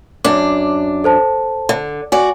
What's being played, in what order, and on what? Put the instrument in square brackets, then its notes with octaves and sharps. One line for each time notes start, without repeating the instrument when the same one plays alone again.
[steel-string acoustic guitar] F#2 D4 [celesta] D6
[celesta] A4 C5 A5
[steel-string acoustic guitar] D3
[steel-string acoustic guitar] F#4 D5 [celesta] G#5